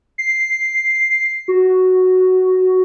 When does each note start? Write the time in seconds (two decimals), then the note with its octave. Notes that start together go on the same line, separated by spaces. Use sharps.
0.18 C7
1.48 F#4